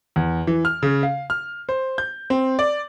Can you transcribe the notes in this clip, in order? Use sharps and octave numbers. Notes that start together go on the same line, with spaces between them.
E2
E3
F6
C#3
F5
F6
C5
G6
C4
D5